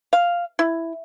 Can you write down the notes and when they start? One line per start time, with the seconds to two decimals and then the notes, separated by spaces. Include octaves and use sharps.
0.13 F5
0.59 E4